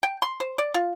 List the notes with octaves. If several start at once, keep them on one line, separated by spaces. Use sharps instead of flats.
G5
C6
C5
D5
F4